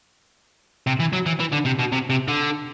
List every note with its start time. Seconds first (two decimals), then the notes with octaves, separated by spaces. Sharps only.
0.87 C3
1.00 E3
1.13 F#3
1.26 E3
1.40 E3
1.53 D3
1.66 C3
1.79 B2
1.93 C3
2.10 C3
2.28 D3